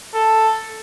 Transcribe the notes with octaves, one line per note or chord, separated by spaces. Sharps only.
A4